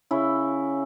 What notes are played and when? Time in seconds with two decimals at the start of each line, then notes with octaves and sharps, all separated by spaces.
0.11 C#3 C#4 E4